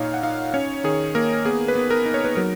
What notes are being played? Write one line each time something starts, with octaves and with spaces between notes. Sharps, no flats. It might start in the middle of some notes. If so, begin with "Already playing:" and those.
Already playing: A#2 D#4 C#5 F5
F#5
D#4 F5
C#4 C#5
D#3 G#4
A#3 A#4
B3 G#4
B4
B3
A#4
D#4
C#5
B4
F#3 A#4